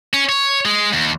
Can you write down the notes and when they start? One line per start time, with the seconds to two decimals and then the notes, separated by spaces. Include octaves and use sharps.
0.14 C#4
0.29 C#5
0.65 G#3
0.93 D#2